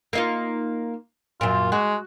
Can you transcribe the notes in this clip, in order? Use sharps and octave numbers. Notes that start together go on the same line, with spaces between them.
A#3 D#4 F4
F#2 A#2 F4
G#3 F#4